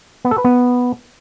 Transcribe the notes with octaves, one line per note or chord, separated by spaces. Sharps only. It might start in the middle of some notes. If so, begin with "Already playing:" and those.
B3
A4
B4
B3